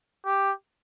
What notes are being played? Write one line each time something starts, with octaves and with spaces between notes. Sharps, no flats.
G4